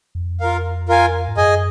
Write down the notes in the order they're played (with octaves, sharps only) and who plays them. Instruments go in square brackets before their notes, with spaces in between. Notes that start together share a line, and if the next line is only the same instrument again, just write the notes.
[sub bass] F2
[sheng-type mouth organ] F4 A#4 F5
F4 A#4 F5 G#5
[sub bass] G#2
[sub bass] F#2 [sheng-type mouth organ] G#4 D#5 G#5